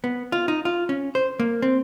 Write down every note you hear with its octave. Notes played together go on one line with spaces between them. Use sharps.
B3
F4
D#4
F4
C#4
C5
A#3
C4